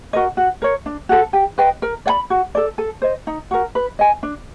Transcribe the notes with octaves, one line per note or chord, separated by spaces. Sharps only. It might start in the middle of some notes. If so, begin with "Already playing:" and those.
F#4 A#4 D#5
F#4
A#4 C#5
D4
F#4 A4
G4
B4 D#5 G5
A#4
D5 F#5 B5
F#4
A4 D5
A4
C5 D#5
D#4
F#4 A#4
B4
D#5 G#5
D4